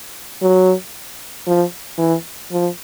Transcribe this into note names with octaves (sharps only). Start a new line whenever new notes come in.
F#3
F3
E3
F3